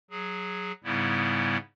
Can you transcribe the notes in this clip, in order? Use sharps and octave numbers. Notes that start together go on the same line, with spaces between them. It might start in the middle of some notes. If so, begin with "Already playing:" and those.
F#3 G#4
G#2 C#3 G3 B3 E4